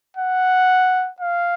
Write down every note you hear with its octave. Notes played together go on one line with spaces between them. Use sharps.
F#5
F5